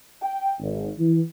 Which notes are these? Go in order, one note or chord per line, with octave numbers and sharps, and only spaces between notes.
G5
G#1
E3